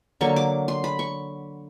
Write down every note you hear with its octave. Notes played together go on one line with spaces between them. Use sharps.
D3 F#3 A#3 C#6
D6
C6
B5
C#6